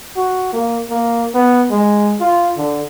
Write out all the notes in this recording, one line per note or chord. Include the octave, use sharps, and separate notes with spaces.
F#4
A#3
A#3
B3
G#3
F4
D3